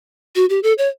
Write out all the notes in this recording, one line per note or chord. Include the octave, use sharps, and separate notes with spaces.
F#4
G4
A4
C#5